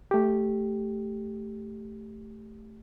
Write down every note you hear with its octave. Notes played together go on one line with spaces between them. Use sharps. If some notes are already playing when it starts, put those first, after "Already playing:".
A3 G4